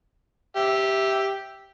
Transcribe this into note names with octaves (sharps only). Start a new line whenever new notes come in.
G4 E5